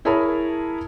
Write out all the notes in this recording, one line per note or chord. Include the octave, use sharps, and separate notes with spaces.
E4 G#4 A#4 C#5 A5 B5